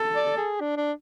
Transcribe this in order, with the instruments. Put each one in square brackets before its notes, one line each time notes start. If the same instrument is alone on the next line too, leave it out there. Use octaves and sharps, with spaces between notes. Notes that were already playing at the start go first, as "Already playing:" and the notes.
Already playing: [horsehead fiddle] A4
[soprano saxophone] D5
G#4
D4
D4